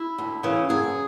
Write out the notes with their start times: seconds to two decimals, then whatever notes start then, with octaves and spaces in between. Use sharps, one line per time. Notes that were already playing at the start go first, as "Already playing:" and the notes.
Already playing: E4
0.18 D2
0.43 C#3 E3
0.69 F#2 G#4